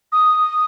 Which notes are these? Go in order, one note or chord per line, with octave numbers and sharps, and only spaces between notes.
D#6